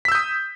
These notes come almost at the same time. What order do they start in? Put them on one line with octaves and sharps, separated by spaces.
B6 E6 G6 D#6